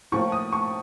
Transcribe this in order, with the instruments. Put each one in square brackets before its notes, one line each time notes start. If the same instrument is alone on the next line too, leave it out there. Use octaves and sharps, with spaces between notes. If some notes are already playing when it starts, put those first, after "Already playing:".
[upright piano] A2 F3 A#3 C#6
D#6
C#6